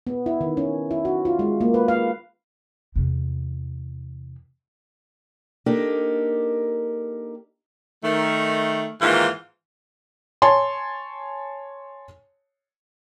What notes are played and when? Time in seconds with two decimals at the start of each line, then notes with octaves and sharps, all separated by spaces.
0.07 B3
0.26 E4
0.41 D#3
0.57 C#4
0.91 E4
1.05 F#4
1.25 F4
1.39 G#3
1.61 A#3
1.74 B4
1.88 F5
2.96 E2 C3
5.66 A#3 D4 D#4 G4 A4 A#4
8.03 D#3 A3
9.01 G#2 D#3 E3 A#3 F4
10.42 C#5 G#5 A5 C6